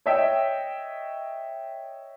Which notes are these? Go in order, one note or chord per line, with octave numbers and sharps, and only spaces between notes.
C#5 D#5 E5 G5